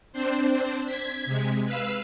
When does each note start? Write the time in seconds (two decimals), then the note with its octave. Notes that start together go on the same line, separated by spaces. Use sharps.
0.13 C4 D4 C5
0.86 G#6 B6
1.26 C3 G#3
1.65 B4 F5 E6